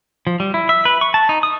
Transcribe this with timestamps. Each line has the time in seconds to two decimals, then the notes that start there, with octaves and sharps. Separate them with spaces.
0.27 F3
0.40 G3
0.54 E4
0.69 E5
0.85 B4
1.01 C#6
1.14 A5
1.29 D#4
1.43 D#6